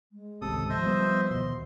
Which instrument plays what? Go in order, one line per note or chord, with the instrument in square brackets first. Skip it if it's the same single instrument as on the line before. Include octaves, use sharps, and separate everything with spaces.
[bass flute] G#3
[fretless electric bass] G#1 C#2 C3 [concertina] A4 D#6
[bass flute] F3 [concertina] C5 D#5 E5
[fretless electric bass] G3 B3
[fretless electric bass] D#2 B2 [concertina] C6